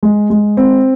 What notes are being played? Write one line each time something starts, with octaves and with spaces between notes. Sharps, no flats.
G#3
G#3
C4